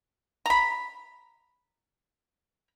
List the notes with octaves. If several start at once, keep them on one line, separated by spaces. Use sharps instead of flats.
A#5 B5